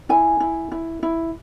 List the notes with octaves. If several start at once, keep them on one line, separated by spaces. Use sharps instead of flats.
E4 G#5
E4
E4
E4